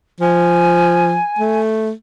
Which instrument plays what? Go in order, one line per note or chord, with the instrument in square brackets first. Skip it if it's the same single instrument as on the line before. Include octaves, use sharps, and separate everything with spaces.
[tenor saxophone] F3 [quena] G#5
[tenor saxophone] A3